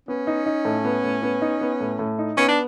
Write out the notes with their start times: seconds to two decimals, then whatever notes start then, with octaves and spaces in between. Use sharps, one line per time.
0.08 B3 C#4
0.27 D#4
0.46 D#4
0.65 A2
0.85 B3
1.04 A2
1.23 B3
1.42 D#4
1.61 B3
1.80 A2
1.99 A2
2.19 D#4
2.37 B3 C#4
2.48 D4